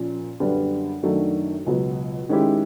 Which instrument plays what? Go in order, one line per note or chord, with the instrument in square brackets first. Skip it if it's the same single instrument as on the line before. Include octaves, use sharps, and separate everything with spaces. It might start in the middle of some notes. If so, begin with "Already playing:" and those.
Already playing: [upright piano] A#2 F3 A#3 C#4
F#2 D3 G3 B3 D4
F#2 D#3 F#3 A3 D4
C#2 B2 F#3
D#3 G#3 C#4 E4 G4